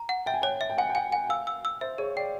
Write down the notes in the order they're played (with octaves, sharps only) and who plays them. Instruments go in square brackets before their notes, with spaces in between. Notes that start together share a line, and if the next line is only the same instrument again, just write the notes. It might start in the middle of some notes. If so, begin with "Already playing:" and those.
Already playing: [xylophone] A#5
F#5
[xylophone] E5 [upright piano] G5
[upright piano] G#5
[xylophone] C#5 [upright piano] G5
[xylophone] E5
[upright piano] G5
[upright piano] F#5 [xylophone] G#5
[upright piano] G5
[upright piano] F#5 [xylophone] G#5
[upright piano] F#5 [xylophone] G#5
[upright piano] F5 [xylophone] E6
[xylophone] E6
E6
[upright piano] C5 [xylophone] E5
[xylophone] G#4 [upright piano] C#5
[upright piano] D5 [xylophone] G5